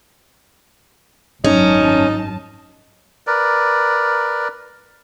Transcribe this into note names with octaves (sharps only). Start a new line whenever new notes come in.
G#1 F#2 C#4 D#4 A5
A#4 B4 D5